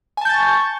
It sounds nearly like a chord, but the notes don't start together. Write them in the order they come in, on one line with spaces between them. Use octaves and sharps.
G#5 A5 G6 A6 C#6